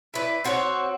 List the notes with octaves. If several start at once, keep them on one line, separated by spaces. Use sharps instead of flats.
E4 B4 D5
C4 F#4 C5 C#5